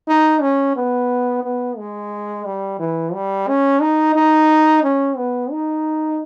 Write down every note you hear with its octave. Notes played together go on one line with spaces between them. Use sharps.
D#4
C#4
B3
B3
G#3
G3
E3
G3
C#4
D#4
D#4
C#4
B3
D#4